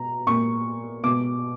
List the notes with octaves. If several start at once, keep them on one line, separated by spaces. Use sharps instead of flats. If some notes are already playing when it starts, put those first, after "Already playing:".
Already playing: B2 A#5
A#2 C#6
B2 D6